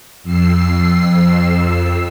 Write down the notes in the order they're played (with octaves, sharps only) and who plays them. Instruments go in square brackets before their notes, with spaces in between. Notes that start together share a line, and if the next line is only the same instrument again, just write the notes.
[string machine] F2 E6 C7